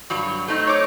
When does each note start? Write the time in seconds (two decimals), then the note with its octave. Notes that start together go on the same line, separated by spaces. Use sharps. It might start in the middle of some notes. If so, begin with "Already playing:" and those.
0.10 G2 F#3 C#5
0.48 A3 C4 D#4
0.67 C#5 D6